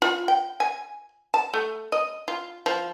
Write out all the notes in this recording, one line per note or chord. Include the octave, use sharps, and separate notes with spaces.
F4
G5
G#5
A5
A3
D#5
F4
F3